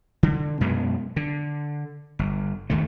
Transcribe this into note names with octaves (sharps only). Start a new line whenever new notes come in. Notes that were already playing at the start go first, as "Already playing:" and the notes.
D3
F#2 B2 G#3 B3
D3
G1
G#1 D#2 D#3 A3